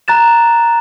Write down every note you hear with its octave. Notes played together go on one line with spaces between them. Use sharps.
A#5 F#6 A6 E7